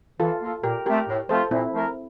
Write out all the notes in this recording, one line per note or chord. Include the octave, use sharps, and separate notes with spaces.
E3 F4 A4
A#3 F4 A4
A#2 G4 A#4
A3 C4 G4 A#4
A2
F3 A3 C4 F4 A4 C5
A#2 C4 E4
F3 A3 E4 A#4